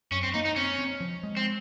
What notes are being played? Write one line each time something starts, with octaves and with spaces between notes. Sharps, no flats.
F#2 C#4
C4
A#3 D#4
D#4
C4 C#4
C4
F3
G#3
C4